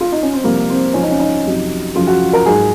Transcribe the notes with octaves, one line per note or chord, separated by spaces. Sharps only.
F4
D#4
C#4
C4
C2 C3 F3 A#3
C4
C#2 C#3 F3 C#4
D#4
C#4
D#4
F2 C3 F#3
F#2 C#3 F3 F4
F#4
A#4
G#2 F#3 G#4